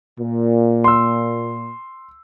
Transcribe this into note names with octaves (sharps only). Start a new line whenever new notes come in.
A#2
C6 E6